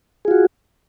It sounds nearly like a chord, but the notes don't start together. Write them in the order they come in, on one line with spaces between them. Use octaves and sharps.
G#4 F4 F#4